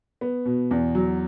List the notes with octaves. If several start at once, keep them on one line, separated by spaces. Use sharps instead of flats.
B3
B2
E2
F#3